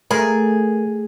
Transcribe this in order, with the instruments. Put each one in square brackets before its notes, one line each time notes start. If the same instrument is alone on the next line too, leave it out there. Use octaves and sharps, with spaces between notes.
[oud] A3 [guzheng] G#4 [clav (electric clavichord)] A#4